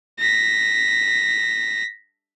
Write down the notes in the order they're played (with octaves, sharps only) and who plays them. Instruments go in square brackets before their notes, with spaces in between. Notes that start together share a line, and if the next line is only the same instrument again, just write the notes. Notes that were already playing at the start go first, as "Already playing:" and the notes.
[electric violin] A#6 B6